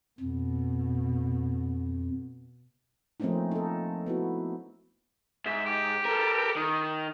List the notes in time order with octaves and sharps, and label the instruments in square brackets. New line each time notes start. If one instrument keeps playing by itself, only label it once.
[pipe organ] F2 [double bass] B2
[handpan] F3 A3 A#3 C4 C#4 D#4
D#4 A4
B3 E4 F#4
[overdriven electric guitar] G#2 [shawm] E5
[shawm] G4
[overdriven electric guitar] A4 A#4
[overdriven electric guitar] D#3 [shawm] D#5